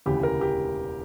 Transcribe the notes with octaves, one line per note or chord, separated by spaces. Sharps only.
E1 D2 C#3 E3 G4
A#4
G4